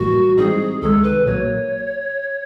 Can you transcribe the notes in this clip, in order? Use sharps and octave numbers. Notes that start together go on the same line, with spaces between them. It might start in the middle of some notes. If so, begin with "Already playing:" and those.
Already playing: A#1 A2 E3 G3 A#3 F#4
G#2 E3 G3 C4 D#4 G#4
C#2 C3 D#3 G#3 A4
B4
B1 A#2 F#3 A#3 C#5